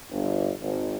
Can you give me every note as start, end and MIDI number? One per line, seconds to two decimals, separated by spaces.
0.11 0.51 31
0.61 0.96 32